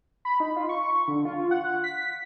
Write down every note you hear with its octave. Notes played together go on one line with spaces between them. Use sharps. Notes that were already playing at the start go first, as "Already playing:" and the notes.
B5
D#4
F4
C#6
D3
F4
F#5
B6